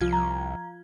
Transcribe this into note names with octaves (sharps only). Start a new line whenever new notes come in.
C2 F3 F4 G#6
A#5